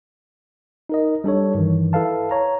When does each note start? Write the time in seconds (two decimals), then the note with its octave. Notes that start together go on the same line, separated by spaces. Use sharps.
0.89 D#4 A#4 D#5
1.24 G3 D4 A4 C#5
1.54 G2 D#3 E3
1.93 E4 A4 B4 F5 A5
2.31 C#5 A#5